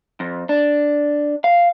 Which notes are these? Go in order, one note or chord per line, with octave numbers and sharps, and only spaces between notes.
F2
D4
F5